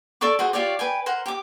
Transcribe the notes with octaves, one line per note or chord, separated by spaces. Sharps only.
A4 D5 C#6 D6
F#4 G#4 C5
F4 G4 C#5 D5
B4 G5 G#5
A#4 C5 F#5
G4 D6